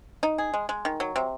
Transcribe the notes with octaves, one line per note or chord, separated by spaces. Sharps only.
D#4
G#4
G#3
G#3
D#3
F#3
C3